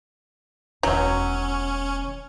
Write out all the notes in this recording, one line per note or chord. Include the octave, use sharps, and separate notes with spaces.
E1 D#3 F#3 C#4